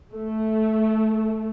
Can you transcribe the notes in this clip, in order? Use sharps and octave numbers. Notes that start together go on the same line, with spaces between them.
A3